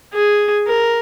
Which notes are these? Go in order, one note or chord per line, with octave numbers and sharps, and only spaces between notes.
G#4
A#4